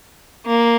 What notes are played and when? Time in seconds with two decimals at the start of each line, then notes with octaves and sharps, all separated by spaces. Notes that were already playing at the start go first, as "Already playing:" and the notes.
0.46 A#3